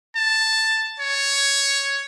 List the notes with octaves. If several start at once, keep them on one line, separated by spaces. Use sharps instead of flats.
A5
C#5